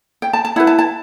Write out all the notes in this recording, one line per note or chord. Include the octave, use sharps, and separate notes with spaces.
G5
A5
A5
E4 B4 F#5
A5
A5